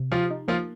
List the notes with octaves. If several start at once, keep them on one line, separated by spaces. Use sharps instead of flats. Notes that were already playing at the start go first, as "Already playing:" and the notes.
Already playing: C3
F3 F4 G4
D#4
F3 A#3 F4